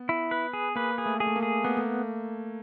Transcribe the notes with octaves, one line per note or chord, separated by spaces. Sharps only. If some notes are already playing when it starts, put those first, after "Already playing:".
Already playing: B3
E4
B4
G#4
A#3 B4
G#4
A3
G#4
A3
A#3
G#4
A#3 B3
A3